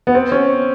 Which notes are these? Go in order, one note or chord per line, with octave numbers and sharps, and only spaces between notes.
B3
C4
C#4